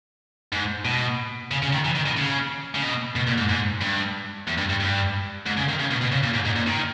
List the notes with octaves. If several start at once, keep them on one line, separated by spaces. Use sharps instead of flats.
G#2
B2
C#3
C#3
D#3
E3
D#3
B2
C#3
C#3
B2
B2
A#2
G#2
G#2
G2
E2
G2
G2
G2
G#2
C#3
D#3
C#3
B2
B2
C#3
A#2
G#2
G#2
A#2
D#3